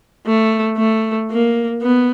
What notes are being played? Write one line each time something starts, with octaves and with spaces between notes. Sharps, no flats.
A3
A3
A#3
B3